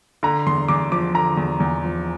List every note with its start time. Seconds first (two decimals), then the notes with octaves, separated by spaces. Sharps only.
0.23 D3 A#5
0.47 E2 C6
0.68 E2 D6
0.91 F3 D6
1.15 D3 A#5
1.37 E2
1.60 E2
1.84 F3